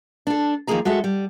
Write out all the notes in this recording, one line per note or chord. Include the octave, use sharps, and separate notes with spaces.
D4 A4
D#2 F3 A3 A#3 G#4 A#5
G#3 F#4 A4 E5
G3